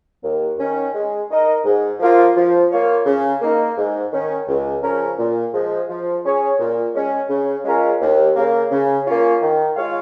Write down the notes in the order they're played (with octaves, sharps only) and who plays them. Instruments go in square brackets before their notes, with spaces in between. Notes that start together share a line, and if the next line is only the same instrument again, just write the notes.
[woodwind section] D#2
D#3 C#4
G#3
D#4 A#4 D#5
G#2
F3 A#3 F4
F3
A#3 F4 C#5
C#3
A#3 D#4
G#2
D#3 C#4
C#2
C#3 F3 C#4 A#4
A#2
F3 G#3
F3
C#4 G#4 C#5
A#2
G#3 C#4
C#3
G#3 C#4 F4 A#4
D#2
C#3 A#3
C#3
A#3 C#4 F4 C#5
D#3
G#3 F4 C#5 F5